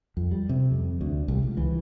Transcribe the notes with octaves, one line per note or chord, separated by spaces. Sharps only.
F2
G3
C3
F2
D2
C2
C#2
E3